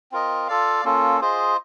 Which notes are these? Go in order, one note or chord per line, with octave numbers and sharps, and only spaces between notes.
C4 F4 A#4 D#5
F4 A4 D5 F5
A#3 C#4 F4 A4
F4 G#4 C5 D#5